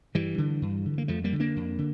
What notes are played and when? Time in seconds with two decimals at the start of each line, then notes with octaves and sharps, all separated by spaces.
0.15 G2 E3 G3
0.38 D3
0.62 G2
0.85 D3
0.98 A#3
1.08 F2 F3 A3
1.24 G3 A#3
1.33 D3
1.40 A#3 D4
1.56 F2
1.78 D3